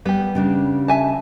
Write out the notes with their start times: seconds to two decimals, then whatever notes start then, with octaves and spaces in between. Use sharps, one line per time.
0.05 G3 B3 G4
0.35 C#3 G3 D4
0.88 E5 G#5 A5